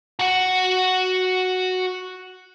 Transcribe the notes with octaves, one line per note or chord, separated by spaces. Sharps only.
F#4 F#5